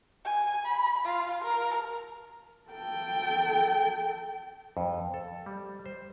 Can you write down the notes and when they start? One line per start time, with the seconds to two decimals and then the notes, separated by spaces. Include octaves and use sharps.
0.25 G#5
0.65 B5
1.05 F4
1.43 A#4
2.70 A4 G5
4.77 F2
5.14 A4
5.46 G3
5.86 C5